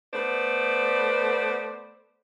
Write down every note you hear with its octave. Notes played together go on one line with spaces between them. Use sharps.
A3 B3 B4 C5 D5